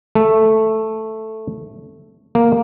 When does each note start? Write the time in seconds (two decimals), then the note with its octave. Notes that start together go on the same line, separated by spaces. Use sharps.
0.15 A3
2.35 A#3